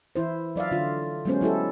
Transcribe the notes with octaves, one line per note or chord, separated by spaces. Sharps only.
E3 E4 C5
F#3 D5 E5 F5
D3 F4
F#3 G#3 B3 C#4 C5
F#3 E4 G4 A4